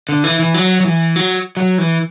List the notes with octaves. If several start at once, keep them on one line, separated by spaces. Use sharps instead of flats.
D3
E3
E3
F#3
F#3
E3
F#3
F#3
E3